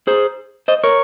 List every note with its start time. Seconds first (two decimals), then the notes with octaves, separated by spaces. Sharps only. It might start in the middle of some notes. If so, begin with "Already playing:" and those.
0.07 G#4 C5
0.68 C5 D#5
0.84 A#4 C#5